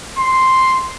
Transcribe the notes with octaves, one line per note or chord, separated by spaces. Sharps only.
C6